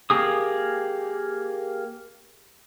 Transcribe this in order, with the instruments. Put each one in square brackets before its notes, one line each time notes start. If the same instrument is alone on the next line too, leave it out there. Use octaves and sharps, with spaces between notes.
[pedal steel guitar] A#3 G4 G#4 D#6